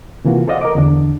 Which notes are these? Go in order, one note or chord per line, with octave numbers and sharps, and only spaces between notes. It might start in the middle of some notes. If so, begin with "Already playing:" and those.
C3 E3 A#3 F4 F#4
A4 C5 D5 D#5 F5 F#5
A#4 D#5 D6
E2 D3 D4